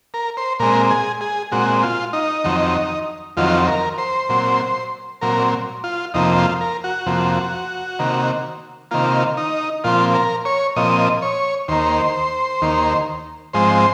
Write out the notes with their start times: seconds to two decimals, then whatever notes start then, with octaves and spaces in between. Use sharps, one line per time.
0.14 A#4
0.37 C5
0.59 A#2 G#3 C4 A#4
0.91 G#4
1.21 G#4
1.52 A#2 G#3 C4 F#4
1.83 F4
2.13 D#4
2.44 F2 D#3 F#3 C4
3.37 F2 D#3 F#3 C4 F4
3.68 A#4
3.98 C5
4.29 A#2 F#3 C4
5.21 A#2 F#3 C4 A#4
5.84 F4
6.14 F2 C3 F3 A#3 D#4
6.38 F4
6.61 A#4
6.84 F#4
7.06 F2 C3 F3 A#3
7.99 C3 D#3 A#3
8.91 C3 D#3 A#3 F4
9.37 D#4
9.84 A#2 F3 C4 F4
10.14 A#4
10.45 C#5
10.76 A#2 F3 C4 D#5
11.22 C#5
11.68 D#2 D#3 A#3 C5
12.62 D#2 D#3 A#3
13.53 G#2 F3 G#3 C4 C5